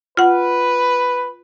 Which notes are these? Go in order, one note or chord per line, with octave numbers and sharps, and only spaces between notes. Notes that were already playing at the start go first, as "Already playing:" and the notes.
F4 B4 F#5